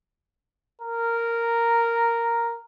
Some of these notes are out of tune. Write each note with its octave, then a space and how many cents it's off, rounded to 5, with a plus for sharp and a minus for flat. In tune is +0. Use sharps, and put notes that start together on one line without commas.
A#4 -5